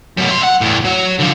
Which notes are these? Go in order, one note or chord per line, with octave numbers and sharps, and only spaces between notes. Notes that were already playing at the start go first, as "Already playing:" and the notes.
F#2 B2
E5 C6
F#5
E2 A2
F#3
D3 F3